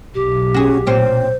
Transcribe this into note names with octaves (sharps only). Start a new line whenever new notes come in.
B1 G4
C#4 F#4 G#4
A#2 C4 C#4 C5